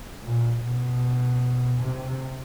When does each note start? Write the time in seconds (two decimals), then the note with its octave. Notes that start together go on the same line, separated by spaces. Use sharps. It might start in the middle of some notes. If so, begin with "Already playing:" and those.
0.23 A#2
0.64 B2
1.82 C3